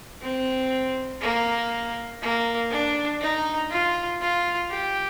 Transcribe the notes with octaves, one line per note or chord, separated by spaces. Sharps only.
C4
A#3
A#3
D4
D#4
F4
F4
G4